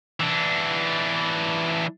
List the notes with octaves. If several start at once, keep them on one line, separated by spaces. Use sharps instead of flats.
E3 D4